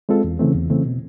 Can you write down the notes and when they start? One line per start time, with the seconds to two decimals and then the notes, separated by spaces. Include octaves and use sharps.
0.09 G#3 C4 F4 A4
0.24 E2
0.39 C#3 E3 A3 C4
0.55 E2
0.70 C#3 E3 A3 C4
0.85 B2